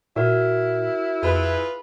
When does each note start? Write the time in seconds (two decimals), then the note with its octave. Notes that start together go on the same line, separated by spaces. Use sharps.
0.16 A#2 E4 F#4 A#4
1.23 F2 F4 G#4 B4